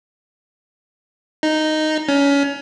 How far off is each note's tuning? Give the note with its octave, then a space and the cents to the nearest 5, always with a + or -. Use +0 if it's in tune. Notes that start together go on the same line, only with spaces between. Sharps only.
D#4 -5
C#4 +25